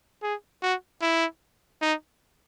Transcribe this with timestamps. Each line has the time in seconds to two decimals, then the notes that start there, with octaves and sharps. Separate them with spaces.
0.23 G#4
0.62 F#4
1.02 E4
1.82 D#4